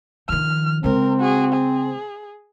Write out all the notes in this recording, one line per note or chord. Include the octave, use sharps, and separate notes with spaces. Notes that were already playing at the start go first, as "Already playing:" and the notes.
D#3 F3 F6
C#3 G#3 C4 A#4
F#4 G#4
G#4